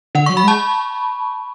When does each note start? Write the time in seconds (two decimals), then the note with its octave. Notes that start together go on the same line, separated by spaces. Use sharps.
0.15 D3 F#5
0.26 C#6
0.30 F#3
0.37 B5
0.43 G#3 A5